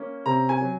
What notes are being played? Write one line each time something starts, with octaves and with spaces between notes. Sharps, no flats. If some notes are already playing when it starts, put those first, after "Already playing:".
Already playing: A#3 C#4
C3 A#5
G#5
F#3